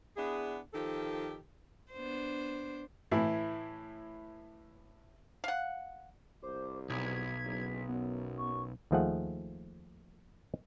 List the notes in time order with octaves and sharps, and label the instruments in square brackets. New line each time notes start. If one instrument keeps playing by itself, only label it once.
[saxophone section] B3 D4 E4 G#4
D#3 F3 G4 A4
[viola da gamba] B3 D4 C5
[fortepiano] A2 E3 E4
[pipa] F5 F#5
[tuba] C2 [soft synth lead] C5 [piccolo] D6
[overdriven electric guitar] B1 [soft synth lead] G#6 [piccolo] B6
[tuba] F#1
[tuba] F#2 [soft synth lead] B3
[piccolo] C#6
[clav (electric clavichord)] D#2 D#3 F3 A3 G#4 F#5